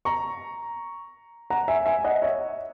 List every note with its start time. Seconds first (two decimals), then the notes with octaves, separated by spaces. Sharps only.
0.05 A#5 C#6
1.50 F#5 A#5
1.68 E5 G#5
1.86 E5 G#5
2.05 D#5 F#5
2.22 C#5 E5